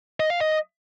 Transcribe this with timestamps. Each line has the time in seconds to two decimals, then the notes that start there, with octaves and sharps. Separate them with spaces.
0.20 D#5
0.30 F5
0.40 D#5